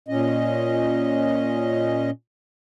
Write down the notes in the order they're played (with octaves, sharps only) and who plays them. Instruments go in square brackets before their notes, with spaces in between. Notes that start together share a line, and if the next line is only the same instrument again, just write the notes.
[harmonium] A#2 C#4 D#5